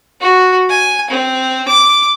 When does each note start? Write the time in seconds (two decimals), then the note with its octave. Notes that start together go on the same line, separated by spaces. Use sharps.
0.21 F#4
0.70 G#5
1.10 C4
1.68 D6